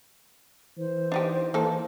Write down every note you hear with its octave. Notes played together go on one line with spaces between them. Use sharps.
E3 C5
D4 D#4 G4
E3 A#3 A4